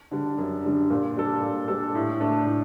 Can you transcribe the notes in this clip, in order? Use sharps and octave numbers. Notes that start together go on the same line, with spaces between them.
D3 G3 D4
F#2
D3 G3 D4
A#2
G3 D4 A4
A#2
G3 D4 A4
A2
A3 D4
A2